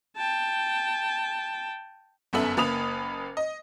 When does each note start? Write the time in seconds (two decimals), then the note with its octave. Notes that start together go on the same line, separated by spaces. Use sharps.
0.17 G5 A5
2.33 G1 F#2 B3 A4 E5 F#7
2.57 F#1 A#3 B4 B5 D#6 F7
3.37 D#5